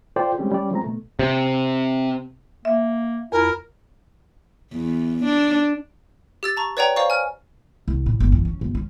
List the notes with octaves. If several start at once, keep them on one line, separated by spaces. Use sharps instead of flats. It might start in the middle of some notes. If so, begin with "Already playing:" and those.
F4 A4 C5 D5 G5
G3 G#3 C4 C#4 G4
G3 C#4 D5
F3 G#3 C4 A#5
B2 A3
C3
A#3 E5
F2 E4 A#4
E2
D4
G4 E6 A6
A5 A#5 C#6
B4 C#5 D5 F#5 G5 A#5
C5 D5 F5 A#5 C#6
G#5 F6
C2
A2
G1
E2
C#4
G1
C#4